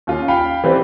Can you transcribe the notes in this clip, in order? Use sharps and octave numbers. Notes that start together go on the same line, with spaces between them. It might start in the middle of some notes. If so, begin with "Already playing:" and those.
D#2 C#4 F4
F5 G5 B5
E3 C4 G4 B4 D5